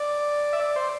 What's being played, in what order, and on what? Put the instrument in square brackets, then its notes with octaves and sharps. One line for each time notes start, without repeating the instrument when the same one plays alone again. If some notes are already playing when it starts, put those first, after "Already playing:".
Already playing: [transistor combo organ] D5
E5
D5
C5